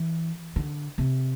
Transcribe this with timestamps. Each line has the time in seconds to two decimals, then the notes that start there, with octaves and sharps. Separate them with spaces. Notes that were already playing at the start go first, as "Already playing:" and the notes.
Already playing: E3
0.56 D3
0.98 C3